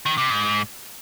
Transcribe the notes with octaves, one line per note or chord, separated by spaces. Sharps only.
D#3
C3
G#2